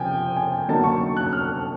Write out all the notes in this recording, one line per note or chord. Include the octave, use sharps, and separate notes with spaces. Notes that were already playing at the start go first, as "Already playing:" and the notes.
Already playing: C3 F3 G5 G#5
G#5
D3 F#3 A#3 D#4 A5
C#6
C#6
F#6
F6